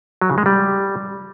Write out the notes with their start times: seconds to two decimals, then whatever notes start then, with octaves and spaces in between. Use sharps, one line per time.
0.21 F#3
0.30 C#3
0.38 G#3
0.46 G3